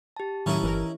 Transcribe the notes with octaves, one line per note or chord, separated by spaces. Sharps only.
G4 A5
F#2 A2 D#3 F#3 C#4 D#4 E4
G1 E3 A#4